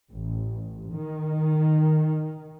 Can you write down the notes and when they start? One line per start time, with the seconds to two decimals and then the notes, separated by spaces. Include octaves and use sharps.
0.11 A1
0.92 D#3